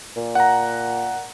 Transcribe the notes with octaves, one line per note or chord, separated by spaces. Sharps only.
A#2
F#5 A#5